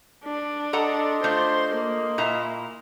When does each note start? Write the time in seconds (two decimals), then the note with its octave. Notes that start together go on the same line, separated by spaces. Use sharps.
0.25 D4
0.73 A4 D#5 F#5 A#5 C6
1.24 A3 D4 F4 C5
1.75 A#3
2.18 A#2 E4 A#5